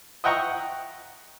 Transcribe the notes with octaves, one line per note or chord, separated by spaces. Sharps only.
D#5 E5 F#5 G5 A#5 C#6